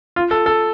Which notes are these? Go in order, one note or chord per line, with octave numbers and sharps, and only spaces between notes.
F4
A4
A4